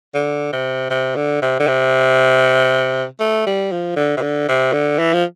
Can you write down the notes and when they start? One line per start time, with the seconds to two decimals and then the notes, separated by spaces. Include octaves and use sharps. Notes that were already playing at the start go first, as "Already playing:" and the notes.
0.14 D3
0.53 C3
0.90 C3
1.16 D3
1.42 C3
1.59 D3
1.67 C3
3.20 A3
3.46 G3
3.72 F3
3.96 D3
4.17 C3
4.22 D3
4.48 C3
4.73 D3
4.98 E3
5.13 F3